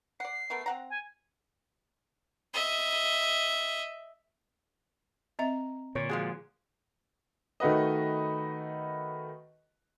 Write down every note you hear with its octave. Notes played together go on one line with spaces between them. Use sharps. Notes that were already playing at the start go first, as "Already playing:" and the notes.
D5 F#5 C7
A3 B3 A#4
C4 F#5 A#5
G#5
D#5 E5
C4 D#5 E5 A#5
A#2 D3 C#5
F3 G#3 F#4 G#4
D#3 A3 F#4 B4 D#5